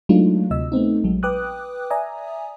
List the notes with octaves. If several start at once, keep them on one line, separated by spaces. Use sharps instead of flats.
F#3 G#3 A3 D4 D#4 F4
D2 C3 D#5 E6
A3 B3 C4 D#4
A#1 F#3 G#3
B4 G5 D6 D#6 F#6
D5 E5 G#5 A#5 D#6